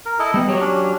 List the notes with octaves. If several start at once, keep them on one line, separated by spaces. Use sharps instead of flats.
A#4
E4 A4 D#5
G3 B3 D#5
F#3 G4 C#5
C#4 D4